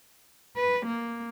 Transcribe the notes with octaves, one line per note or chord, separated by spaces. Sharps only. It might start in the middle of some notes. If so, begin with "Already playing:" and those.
B4
A#3